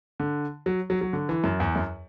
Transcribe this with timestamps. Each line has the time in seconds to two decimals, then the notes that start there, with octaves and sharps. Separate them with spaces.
0.20 D3
0.66 F#3
0.90 F#3
1.01 F#3
1.13 D3
1.29 E3
1.44 F#2
1.60 E2
1.75 F#2